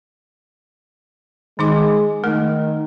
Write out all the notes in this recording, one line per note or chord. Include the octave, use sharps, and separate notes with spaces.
D#3 G#3 D#4 D6
D#3 A3 A#4